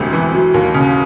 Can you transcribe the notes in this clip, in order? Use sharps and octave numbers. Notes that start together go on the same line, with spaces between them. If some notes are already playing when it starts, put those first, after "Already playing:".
Already playing: E1 D2 C3
E3
F#3
D#2
C#3